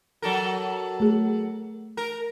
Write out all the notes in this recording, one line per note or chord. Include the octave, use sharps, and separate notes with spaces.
F#3 A4 A#4
A3 G#4
A#4